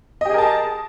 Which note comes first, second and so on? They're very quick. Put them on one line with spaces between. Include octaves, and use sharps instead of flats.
D#5 G4 G#4 A#4 A5